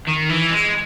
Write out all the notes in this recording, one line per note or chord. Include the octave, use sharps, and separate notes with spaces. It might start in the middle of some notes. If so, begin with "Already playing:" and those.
D#3
E3
G#3